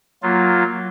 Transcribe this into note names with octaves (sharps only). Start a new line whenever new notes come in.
F#3 A#3 F4